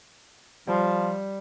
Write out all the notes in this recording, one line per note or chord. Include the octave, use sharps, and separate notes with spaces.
F3 G3